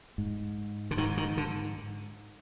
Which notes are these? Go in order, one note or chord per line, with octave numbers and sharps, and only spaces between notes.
G#2
D3
G#2 D#3
D#3
D3